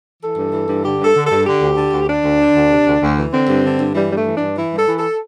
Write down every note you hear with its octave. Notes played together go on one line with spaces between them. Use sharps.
E3 A4
G2
E3
G2
D3 G4
G2 A4
D3
A4
G2
D3 G4
D2
D3
D2
D3 D4
D2
D3
D2
C3
D2
D2
E3
D3 C4
G2
D3
G2
E3 G3
G2 G3 A3
E3
G2 D4
E3 E4
G2
A4
E3
A4